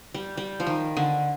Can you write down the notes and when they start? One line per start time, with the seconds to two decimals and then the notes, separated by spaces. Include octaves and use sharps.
0.14 G3
0.37 G3
0.60 F3
0.67 D#3
0.97 D3